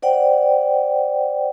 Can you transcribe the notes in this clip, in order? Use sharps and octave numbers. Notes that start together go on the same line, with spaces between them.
C5 D5 F#5 G5